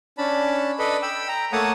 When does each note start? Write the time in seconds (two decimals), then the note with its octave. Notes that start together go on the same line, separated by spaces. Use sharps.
0.18 C#4 D4 A5 B5
0.79 A4 B4 D5 D#5 B5
1.02 G5 B5 E6
1.28 G5 A#5
1.52 A3 A#3 C#5 F#5 A5 D#6